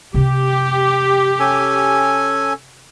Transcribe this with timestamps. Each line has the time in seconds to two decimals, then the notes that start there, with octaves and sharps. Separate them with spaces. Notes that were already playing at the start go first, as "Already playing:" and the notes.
0.14 C3 C4 G4
1.39 C#4 A4 G#5